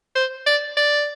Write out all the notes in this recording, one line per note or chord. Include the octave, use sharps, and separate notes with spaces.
C5
D5
D5